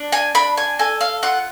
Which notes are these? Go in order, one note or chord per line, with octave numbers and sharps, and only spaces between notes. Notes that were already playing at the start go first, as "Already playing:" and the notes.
Already playing: D4
G#5
D4 B5
G#5
A4 G#5
F5
F4 F#5